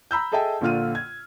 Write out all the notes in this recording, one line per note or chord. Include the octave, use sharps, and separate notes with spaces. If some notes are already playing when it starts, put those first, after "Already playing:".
A#5 B5 E6 G6
G#4 A4 D#5 E5 G5 A5
A#1 A#2 D3 F4 F6 D#7
G#6